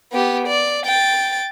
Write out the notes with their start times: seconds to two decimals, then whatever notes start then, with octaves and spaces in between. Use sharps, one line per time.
0.12 B3 G4
0.47 D5
0.86 G5 A6